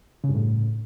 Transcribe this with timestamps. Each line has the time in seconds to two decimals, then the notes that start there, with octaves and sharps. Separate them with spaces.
0.24 C#3
0.29 G2
0.35 A2